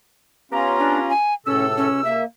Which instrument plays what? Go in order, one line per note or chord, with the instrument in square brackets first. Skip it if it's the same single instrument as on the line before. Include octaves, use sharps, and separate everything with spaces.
[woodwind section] B3 G4 A#5 [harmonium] C#4 F4
[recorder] D4
G#5
[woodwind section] C#2 C3 E6 [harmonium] A2 A4 [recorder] C#4
[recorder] C#4
[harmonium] A#3 [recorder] E5